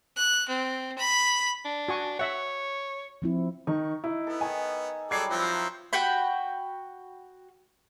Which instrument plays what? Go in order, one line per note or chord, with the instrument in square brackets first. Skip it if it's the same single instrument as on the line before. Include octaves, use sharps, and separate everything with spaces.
[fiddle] F#6
C4
B5
[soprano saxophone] D4
[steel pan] F#4 G#5 C#6
[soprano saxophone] C#5 [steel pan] E5 F#5
[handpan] F3 C4 E4
[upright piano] D#3 D#4 [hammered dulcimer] C#6
[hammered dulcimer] D#4 [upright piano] E4
[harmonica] B3 [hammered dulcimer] A4
[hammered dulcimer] D#3 [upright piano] G#5
[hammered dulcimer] F#3 G3 F#4 [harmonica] G#4 A4 D5 [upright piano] G#6 C7
[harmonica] F3 C4 E4 [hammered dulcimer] F#4 B4
[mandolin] F#4 F#5 G5 B5